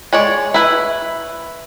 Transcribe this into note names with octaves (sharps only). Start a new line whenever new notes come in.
G#3 C#5 D5
E4 B4